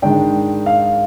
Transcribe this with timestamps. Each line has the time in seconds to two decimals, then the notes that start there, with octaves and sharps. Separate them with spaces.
0.02 G#2 D#3 G#3 D4 G5
0.66 F5